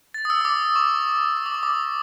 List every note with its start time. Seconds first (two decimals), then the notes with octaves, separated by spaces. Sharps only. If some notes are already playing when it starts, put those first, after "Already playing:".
0.14 A6
0.25 D#6
0.30 E6
0.41 D#6
0.45 D6
0.76 C#6
1.37 D#6
1.46 D6
1.54 C#6
1.63 D6